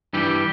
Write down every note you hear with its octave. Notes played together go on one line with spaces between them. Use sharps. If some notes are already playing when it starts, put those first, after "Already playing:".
G2 E3 G3 G4